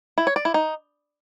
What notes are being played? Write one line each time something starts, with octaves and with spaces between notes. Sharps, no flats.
E4
C#5
D5
E4
D#4